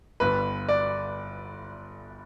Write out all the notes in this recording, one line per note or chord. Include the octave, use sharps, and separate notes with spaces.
G1 G2 D3 B4
D5